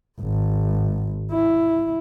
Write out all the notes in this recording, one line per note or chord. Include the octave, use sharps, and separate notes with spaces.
G#1
E4